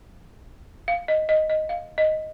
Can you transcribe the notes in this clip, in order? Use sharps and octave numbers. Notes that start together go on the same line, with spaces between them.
F5
D#5
D#5
D#5
F5
D#5